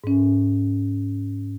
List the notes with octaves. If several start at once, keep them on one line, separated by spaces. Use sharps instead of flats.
G#2 C#4